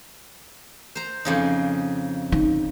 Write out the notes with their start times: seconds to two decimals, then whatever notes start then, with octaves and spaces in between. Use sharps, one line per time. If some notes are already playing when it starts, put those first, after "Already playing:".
0.95 C5 A#5
1.25 F2 C#3 D#4
2.32 D#4